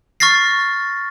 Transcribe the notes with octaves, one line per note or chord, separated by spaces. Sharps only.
C#6 F6 A6 A#6 C7